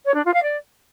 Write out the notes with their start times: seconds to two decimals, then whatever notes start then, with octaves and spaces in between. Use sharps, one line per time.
0.05 C#5
0.15 D4
0.24 F4
0.34 F5
0.43 D5